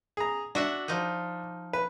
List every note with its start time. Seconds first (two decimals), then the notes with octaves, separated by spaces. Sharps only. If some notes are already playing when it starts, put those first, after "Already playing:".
0.17 G#4 A#5
0.55 D4 F#4 E5 F#5
0.88 F3 D#4
1.73 B4